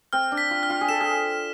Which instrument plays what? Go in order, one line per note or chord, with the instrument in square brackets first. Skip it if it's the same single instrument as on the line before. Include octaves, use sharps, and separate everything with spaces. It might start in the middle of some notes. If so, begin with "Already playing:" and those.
[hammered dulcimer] C4 [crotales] F6
[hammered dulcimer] D4
[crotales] B6
[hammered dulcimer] F4
[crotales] F6
[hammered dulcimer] F4
G#4
[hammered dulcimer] A4 [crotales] E7
[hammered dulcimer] G#4